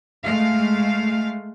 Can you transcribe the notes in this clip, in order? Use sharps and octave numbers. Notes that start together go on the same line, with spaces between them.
G#3 A3 F5